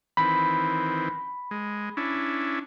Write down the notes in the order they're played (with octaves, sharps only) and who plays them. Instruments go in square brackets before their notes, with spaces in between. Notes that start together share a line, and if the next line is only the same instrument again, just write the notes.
[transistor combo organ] D#3 E3 C4 [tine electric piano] B5
[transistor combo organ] G#3
C#4 D4 E4